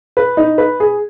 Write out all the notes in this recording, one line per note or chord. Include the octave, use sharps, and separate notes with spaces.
B4
D#4
B4
G#4